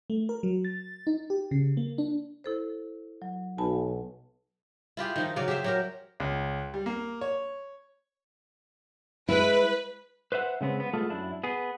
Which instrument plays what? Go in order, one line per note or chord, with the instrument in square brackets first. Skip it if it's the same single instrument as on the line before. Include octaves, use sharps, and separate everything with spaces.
[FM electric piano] A3
A#4
F#3
A6
D#4
G4
C#3
A#3
D4
[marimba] E4 A4 C5
F#3
[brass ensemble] B1 [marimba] G#5 A5 B5
[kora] E4 F4 G4 G#4
D#3 F3 D#4
C#3 F#3 D5 F5
G4 G#4 C5 E5
F#3 G4 A#4
[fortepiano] C#2
G3
A#3
C#5
[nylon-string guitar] G#3 E4 [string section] B4
[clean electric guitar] B4 C5 E5 F#5
C#3 G#3 B3 C4
B3
G#3 A3 B3 F4 G#4 A4
F#2 D4 E4
B3 G#4